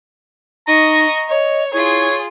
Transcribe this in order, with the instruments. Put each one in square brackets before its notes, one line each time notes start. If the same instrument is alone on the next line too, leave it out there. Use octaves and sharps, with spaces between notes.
[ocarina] D#4 [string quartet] D#5 C#6 [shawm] A#5
[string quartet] C#5 [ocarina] D#5
[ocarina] E4 [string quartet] F4 G#4 [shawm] C#5